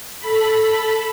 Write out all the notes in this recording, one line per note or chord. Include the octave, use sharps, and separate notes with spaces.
A4 B5